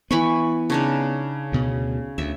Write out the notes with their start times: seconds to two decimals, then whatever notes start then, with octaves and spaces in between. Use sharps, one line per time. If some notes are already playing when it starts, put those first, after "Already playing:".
0.11 E3 B3 B5 C#6
0.70 C#3 D4 D#4
1.52 D2 B2
2.18 D2 E5